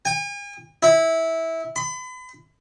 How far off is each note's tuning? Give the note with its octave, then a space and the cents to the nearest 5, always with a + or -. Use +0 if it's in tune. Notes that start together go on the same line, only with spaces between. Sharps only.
G#5 -45
E4 -15
B5 +40